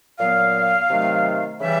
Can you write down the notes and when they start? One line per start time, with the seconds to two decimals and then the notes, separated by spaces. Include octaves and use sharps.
0.19 A#2 F#3 B3 F5
0.90 C3 D#3 F#3 A3
1.60 C#3 E3 G3 E5